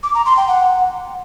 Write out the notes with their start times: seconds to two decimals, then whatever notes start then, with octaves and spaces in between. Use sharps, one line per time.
0.03 D6
0.14 A#5
0.26 C6
0.37 G5
0.48 F#5